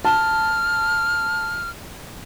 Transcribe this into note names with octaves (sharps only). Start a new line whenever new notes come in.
A5 F6